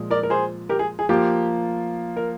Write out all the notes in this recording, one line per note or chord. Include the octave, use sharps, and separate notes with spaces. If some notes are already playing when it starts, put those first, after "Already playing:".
Already playing: A#2 F3 G#3
A#4 D5
A#4
G#4 C5
G4 A#4
G#4
G#4
F3 A#3 F4 G4
A#4